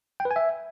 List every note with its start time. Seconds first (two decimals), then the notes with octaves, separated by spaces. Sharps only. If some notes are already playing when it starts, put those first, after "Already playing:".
0.20 G5
0.25 B4
0.31 G#5
0.36 E5